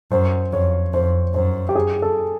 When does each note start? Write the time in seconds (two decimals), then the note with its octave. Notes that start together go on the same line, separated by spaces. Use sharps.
0.12 F#2 C5
0.53 F2 C#5
0.93 F2 C5
1.34 F#2 C5
1.69 G4
1.75 G#4
2.02 A4